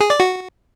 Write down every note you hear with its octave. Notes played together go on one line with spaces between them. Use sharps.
G#4
D5
F#4